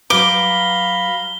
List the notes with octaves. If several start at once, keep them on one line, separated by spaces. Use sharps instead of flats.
F#3 B4 F5 A#5 B5 D6 G7